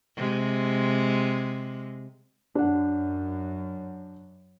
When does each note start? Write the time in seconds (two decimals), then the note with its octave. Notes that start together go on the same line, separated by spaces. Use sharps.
0.16 C3 G#3
2.55 F#2 D4 F#5